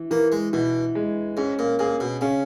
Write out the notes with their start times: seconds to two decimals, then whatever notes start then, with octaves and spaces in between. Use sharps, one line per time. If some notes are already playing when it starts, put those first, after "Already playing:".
Already playing: E3
0.11 E3 A#3
0.32 G#3
0.53 B2 E3
0.95 G#3
1.37 G#2 C#4
1.59 A#2
1.79 A#2 G#4
2.00 B2
2.21 C#3 C#4